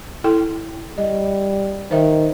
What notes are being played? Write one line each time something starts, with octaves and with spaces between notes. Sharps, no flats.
E4 A4 G5
G3 D#5
D#3 C5 E5